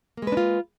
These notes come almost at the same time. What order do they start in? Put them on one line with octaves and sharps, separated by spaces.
A#3 G#3 B4 D4 F4